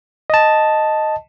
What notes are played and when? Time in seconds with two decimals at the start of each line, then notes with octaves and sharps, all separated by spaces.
0.30 D#5 A5